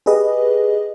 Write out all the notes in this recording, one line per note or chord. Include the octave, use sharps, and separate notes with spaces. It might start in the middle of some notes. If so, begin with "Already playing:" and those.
G4 G#4 B4 D#5